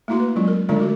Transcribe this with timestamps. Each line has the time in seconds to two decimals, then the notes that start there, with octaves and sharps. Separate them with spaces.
0.08 A3 A#3 E4 F#4 C6
0.20 B4
0.36 F#3 G#3 C#4 F4
0.48 A#4
0.69 D3 G#3 A3 D4 F4 D5
0.80 A3 F#4 A#4